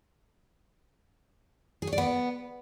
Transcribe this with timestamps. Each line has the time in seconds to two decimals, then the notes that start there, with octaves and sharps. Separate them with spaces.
1.82 G#4
1.87 C#5
1.93 D5
1.98 B3